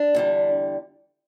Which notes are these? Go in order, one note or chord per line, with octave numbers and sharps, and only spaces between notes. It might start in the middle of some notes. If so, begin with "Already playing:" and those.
Already playing: D4
E2 D3 G3